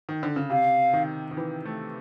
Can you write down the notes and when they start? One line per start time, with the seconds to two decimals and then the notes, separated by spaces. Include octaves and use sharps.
0.09 D#3
0.23 D3
0.36 C#3
0.50 C3 F5
0.93 D#3
1.31 D#3
1.37 E3
1.65 A3